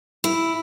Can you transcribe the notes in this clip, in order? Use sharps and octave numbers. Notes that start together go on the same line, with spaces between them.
E4